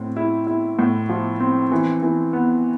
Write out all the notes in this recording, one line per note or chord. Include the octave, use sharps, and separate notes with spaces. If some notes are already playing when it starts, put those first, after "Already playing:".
Already playing: A2 C4
E4
E4
A2
F3
C4
E3
E3
B3